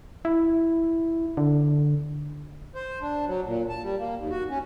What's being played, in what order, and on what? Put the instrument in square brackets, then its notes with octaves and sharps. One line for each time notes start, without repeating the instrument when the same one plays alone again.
[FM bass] E4
D3
[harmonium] C5
D4
F#3
A#2
A5
G3
A#3
D#2
F#4
C#4